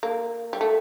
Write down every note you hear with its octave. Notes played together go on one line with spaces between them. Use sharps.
A#3
G3
A3